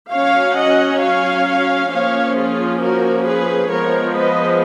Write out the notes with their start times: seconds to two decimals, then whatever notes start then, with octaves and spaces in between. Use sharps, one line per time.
0.12 F#3 C#4 C#5 F5
0.57 D#5 F#5
1.02 C#5 F5
1.92 F3 A#3 C#4 C#5 F5
2.37 F4 G#4
2.82 F#4 A#4
3.27 G#4 B4
3.71 F3 G#3 B3 A#4 C#5
4.17 B4 D#5